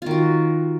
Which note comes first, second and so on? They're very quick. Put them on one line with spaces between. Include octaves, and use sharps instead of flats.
F4 D#3 F#4